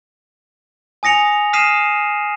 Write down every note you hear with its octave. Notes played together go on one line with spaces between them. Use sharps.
G#5 D#6 A#6 C#7 F7
D#6 F6 B6 C7 D#7 E7